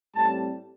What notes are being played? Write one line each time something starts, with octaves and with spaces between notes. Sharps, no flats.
A2 G3 C4 A5